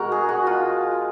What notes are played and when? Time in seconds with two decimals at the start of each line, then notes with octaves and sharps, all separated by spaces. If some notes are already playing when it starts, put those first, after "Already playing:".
Already playing: B2 G#3 F#4 A#4
0.12 G#4
0.29 F#4
0.47 F4